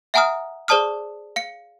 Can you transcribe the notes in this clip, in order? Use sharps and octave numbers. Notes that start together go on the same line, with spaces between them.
E5 F#5 G#5 A#5 D#6 F6
G#4 C5 D5 A5 D#6 F6
F5 C#7